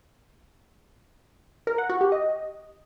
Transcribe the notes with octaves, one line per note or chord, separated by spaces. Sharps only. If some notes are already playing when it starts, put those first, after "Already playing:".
A#4
F#5
F#4
G4
D#5